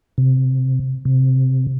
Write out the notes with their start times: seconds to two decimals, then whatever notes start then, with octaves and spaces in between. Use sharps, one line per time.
0.18 C3
1.05 C3